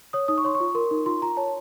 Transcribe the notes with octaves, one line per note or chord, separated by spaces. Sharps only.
C#5 D#6
D#4 D#6
C#6
C#5 C6
C#6
F4
A#4 C6
D#4
F4 C6
F4 A#5
C#5 A5